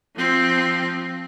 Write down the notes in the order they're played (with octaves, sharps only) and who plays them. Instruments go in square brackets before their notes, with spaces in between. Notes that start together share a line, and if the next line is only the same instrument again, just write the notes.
[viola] F3 C4